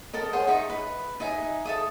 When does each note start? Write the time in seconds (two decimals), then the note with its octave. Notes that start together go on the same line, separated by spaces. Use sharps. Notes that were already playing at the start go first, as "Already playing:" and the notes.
0.14 A4 A#4 D#5
0.33 G#4 C5 C#5 F#5
0.47 D#4 E5 G5 C#6
0.70 B4
1.20 D#4 E5 G#5
1.65 A4 E5 D#6